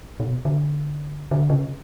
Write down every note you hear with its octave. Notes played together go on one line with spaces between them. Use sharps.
B2
D3
D3
C#3